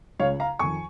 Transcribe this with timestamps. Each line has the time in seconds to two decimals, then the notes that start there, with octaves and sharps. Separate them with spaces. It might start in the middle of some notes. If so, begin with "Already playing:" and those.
0.20 C#2 C#3 C#5 F5
0.40 F5 A#5
0.59 F2 D#3 G#5 C#6